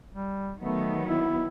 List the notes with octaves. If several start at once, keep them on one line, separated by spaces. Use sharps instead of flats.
G3
D#3 F#3 A3 B3
E4